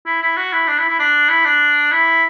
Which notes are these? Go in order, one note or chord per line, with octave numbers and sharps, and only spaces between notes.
E4
E4
F#4
E4
D4
E4
E4
D4
E4
D4
E4